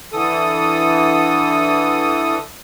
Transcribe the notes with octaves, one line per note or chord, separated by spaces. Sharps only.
D3 E3 A4 D#6